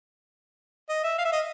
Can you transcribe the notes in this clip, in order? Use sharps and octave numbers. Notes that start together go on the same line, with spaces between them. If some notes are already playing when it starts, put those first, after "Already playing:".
D#5
E5
F5
E5
D#5